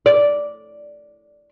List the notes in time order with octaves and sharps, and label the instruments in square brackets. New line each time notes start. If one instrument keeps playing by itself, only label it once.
[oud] D5